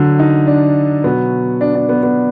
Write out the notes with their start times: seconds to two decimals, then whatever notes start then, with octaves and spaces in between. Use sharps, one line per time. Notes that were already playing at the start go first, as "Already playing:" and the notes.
Already playing: D3 F#3
0.19 D#4
0.47 D4
1.04 B2 F#3 B3
1.61 D4
1.75 D4
1.89 B3
2.03 B3